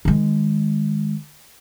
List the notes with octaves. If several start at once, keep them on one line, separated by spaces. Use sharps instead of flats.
D#3 G#3